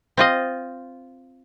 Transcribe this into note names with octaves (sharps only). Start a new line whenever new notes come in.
C4 F4 D#5